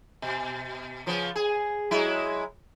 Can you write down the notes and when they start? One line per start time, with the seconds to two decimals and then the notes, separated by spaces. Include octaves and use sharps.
0.22 B2
1.06 C#3 F3 B3
1.36 G#4
1.91 F#3 G#3 E4